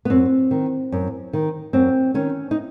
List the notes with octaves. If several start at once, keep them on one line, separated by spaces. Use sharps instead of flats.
B3
F#2 C4
D#3
F#2
D#3
F#2 C4
D#3 C#4
D#4